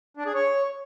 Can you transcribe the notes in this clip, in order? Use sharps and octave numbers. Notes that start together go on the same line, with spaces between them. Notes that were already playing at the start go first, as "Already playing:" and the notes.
D4
G#4
C#5